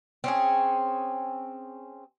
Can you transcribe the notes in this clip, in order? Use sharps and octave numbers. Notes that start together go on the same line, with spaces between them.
C4 C#4 G#4